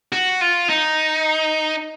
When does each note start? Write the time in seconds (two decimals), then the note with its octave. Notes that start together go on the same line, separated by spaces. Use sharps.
0.12 F#4
0.41 F4
0.70 D#4